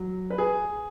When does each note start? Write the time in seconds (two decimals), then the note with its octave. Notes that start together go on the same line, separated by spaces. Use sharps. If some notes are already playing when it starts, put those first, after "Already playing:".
Already playing: F#3
0.30 B4
0.38 G#4